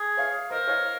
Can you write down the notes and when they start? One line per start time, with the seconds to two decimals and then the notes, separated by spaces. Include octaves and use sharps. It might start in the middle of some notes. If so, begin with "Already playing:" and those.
Already playing: G#4
0.17 C#5 F5
0.51 A#4 C5 D#5
0.67 C#5 F5